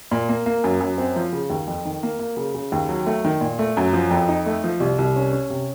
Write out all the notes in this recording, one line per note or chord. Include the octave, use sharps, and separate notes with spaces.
A#2
A#3
A#3
F#2
F#2
C4
F3
C#3
D#2
F2
D#3
A#3
A#3
C#3
C#3
D#2
F#3
A3
D#3
A#2
A3
F#2
F3
F2
D#4
A3
F3
C2
C2
C#4
C#4
C3